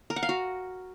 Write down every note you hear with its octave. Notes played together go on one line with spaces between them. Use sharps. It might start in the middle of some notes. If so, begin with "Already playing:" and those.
A#4
F#5
F5
F#4